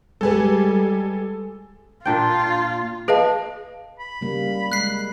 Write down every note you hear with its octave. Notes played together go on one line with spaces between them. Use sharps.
G3 G#3 G#4 A4 B4 G#5
A#2 D4 F4 G5
G#4 B4 D#5 F5 A5
B5
C#3 G3 A#3
G#3 F#6 C7